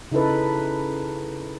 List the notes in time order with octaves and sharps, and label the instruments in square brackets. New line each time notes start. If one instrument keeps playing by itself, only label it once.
[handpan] C#3 D#4 E4 A4 B4